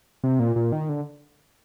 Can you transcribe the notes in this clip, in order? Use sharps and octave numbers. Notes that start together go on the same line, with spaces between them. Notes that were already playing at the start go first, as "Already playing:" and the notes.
C3
A#2
A#2
D#3
D3